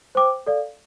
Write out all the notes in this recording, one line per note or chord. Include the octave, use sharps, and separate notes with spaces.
C5 G5 D6
A4 D5 F5